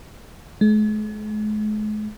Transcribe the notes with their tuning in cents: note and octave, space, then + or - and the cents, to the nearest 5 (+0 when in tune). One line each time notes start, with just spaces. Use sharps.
G#3 +45